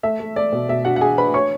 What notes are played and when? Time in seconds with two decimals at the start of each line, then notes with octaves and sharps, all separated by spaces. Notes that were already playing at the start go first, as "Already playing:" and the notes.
0.03 A3 E5
0.20 A3
0.36 A3 D5
0.53 B2
0.69 B2 E5
0.85 D4 F#4 F#5
0.96 F#5
1.01 D4 G#4 G#5
1.18 D4 B4 B5
1.34 C#5 C#6